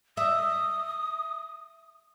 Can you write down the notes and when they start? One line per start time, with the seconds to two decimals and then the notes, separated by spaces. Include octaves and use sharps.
0.17 E5 D#6